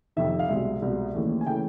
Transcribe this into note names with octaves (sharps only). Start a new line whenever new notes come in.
F2 C3 D#3 E5
F5
C2 B2 G#3 E5
C2 B2 G#3
D#2 C#3 E3 A3
G#5
C#3 E3 A3 G5